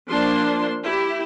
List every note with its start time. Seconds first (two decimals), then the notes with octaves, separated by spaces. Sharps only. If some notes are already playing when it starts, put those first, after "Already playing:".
0.11 F3 A#3 D4 C6
0.84 E4 G4